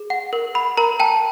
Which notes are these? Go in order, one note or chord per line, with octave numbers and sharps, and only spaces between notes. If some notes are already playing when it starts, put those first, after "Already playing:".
Already playing: G#4
F#5
A#4
F#5 B5
A#4 A#5
G5 A5